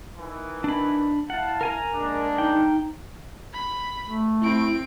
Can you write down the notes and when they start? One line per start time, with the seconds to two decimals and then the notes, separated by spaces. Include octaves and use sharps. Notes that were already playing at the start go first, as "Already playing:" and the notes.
0.17 D#3 E3
0.64 D4 B5
1.30 E4 F5 F#5 A5
1.61 A#4 G#5 A#5
1.94 G#3 A#3 D4
2.38 D#4 G5
3.53 B5
4.05 A3
4.42 C4 E4 D7